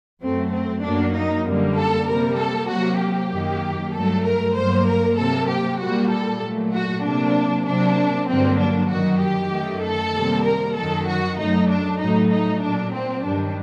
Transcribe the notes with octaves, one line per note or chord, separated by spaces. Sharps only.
F#2 F#3 A3 C4
C4
F#2 F#3 A#3 D4
D#4
F#2 D3 G3 A#3
A4
C3 G3 A#3 A#4
A4
C3 F#3 A#3 F#4
G4
F#2 D#3 F#3 A#3
G2 F#3 A3 A4
A#4
G2 F#3 A#3 C5
A#4
C3 F#3 A#3 A4
G4
A#2 G3 A#3 F#4
A4
A#2 F#3 A3
F#4
C3 F#3 A#3 D4
C3 F#3 A#3 D4
G2 D3 F#3 A#3 C4
D4
F#2 D#3 F#3 F#4
G4
F#2 D#3 A3
A4
C3 D#3 G3 A#3
A#4
F#2 D#3 F#3 A4
F#4
F#2 F#3 A3 D#4
D4
A2 F#3 A3 D#4
D#4
A#2 F#3 A#3 D4
C4
G2 D#3 G3 D4